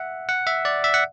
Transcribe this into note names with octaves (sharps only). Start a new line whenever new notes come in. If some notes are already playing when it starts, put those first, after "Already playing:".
Already playing: E5 F#5
F#5
E5
D5
E5
F#5